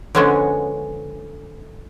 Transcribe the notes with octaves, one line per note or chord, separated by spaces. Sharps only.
D3 F3 G#3 B3 C#4